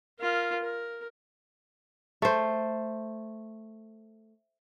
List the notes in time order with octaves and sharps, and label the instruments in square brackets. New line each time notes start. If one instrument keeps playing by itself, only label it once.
[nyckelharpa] F4 A#4
A#4
[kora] A3 C5